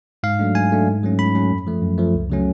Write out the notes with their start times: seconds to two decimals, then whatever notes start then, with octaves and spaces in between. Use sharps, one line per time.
0.23 G#2 F5
0.39 F#3 A3 D4
0.55 G#2 G#5
0.71 F#3 A3 D4
0.87 G#2
1.03 F#3 A3 C#4
1.19 G#2 B5
1.35 F#3 A3 C#4
1.51 F#2
1.67 F3 A3
1.82 F#2
1.98 F3 A3
2.14 C#2
2.30 C#3 F#3 A3 C#4